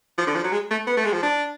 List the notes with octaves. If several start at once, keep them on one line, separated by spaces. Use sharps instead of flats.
F3
D3
F3
F#3
G#3
A3
B3
A3
G#3
F3
D4